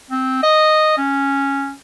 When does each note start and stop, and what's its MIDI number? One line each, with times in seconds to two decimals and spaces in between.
0.10 0.42 60
0.43 0.95 75
0.98 1.72 61